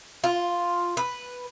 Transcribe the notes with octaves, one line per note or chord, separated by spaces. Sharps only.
F4
B4